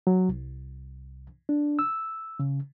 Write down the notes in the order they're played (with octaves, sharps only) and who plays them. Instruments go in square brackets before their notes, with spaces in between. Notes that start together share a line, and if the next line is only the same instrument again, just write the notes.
[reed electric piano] F#3
C2
D4
E6
C#3